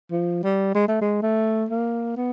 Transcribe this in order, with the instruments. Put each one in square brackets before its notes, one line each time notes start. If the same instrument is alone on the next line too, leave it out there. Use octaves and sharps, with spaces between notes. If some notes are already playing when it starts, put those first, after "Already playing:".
[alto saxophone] F3
G3
G#3
A3
G#3
A3
A#3
B3